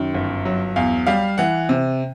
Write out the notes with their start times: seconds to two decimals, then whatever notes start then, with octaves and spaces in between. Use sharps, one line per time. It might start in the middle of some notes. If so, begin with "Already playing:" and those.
Already playing: F#2 D#3
0.14 G1
0.45 F#3
0.76 E2 F5
1.07 G3 F5
1.38 E3 F#5
1.69 C3